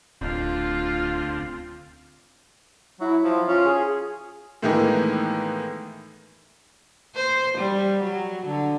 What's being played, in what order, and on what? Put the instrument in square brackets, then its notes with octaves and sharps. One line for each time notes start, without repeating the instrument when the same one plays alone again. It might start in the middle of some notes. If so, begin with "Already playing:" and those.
[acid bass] D1 [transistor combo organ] D2 C4 [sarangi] F4
[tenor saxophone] F#3 [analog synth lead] E4
[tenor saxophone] F3
[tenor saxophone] C#4 [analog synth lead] F4
[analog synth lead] G#4
[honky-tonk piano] A2 D#3 E3 G#3 A#3 B3
[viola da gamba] C5
G3
F#3
D3